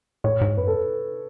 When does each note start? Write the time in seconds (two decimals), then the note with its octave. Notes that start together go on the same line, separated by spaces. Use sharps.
0.24 A2 C#5
0.41 G#2
0.57 F#2 B4
0.67 A4